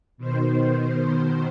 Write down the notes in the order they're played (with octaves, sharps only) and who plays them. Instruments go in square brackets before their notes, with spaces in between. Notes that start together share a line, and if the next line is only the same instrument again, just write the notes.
[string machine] B2 D#3 C5